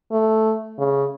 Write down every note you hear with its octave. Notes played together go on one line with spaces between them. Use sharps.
A3
C#3